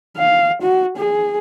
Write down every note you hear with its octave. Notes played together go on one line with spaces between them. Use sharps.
F5
F#4
G#4